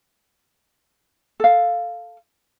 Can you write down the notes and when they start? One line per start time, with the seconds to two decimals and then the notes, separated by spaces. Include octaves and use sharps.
1.40 A4 F5